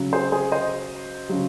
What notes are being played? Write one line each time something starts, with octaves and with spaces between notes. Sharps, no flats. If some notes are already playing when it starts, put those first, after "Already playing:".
Already playing: C#3 F#3
G#4 C5
G#4 C5
C5 D#5
C#3 F#3